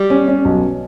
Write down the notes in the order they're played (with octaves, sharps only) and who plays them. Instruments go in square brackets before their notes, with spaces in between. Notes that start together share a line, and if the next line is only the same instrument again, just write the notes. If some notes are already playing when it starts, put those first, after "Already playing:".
Already playing: [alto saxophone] G3
[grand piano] C#4
C#4
B1